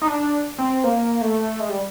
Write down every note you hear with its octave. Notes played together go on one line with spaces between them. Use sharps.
D#4
D4
C4
A#3
A3
G#3
G3